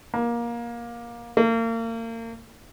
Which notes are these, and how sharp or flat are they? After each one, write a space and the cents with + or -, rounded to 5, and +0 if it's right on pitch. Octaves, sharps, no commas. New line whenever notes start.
A#3 +20
A#3 -35